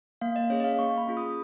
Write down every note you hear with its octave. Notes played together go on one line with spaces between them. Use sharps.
A#3 F5
D#5
C#4 G#4 C#5
D#5
F5
A#3 C#6
B5
C#4 F4 G#4
D#6